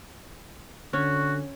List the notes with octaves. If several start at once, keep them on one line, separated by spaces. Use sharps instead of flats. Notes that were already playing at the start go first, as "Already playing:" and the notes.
D3 C#4 F#4